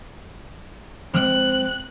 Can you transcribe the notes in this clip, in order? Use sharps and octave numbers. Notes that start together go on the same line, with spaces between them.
F3 G#3 C4 F#6